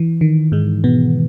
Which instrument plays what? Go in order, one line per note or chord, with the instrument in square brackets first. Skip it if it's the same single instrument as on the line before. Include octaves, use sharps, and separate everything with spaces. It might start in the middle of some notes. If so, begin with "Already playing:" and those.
Already playing: [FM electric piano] E3
D#3
G#2 G#3
B2 B3